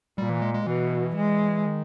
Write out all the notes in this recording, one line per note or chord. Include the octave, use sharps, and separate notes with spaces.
A#2 G3
E3
G#3
G#3
B2 E3
G#3
D#3